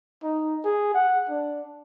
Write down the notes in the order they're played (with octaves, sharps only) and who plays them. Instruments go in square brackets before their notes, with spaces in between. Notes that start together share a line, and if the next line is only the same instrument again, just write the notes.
[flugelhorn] D#4
G#4
F#5
D4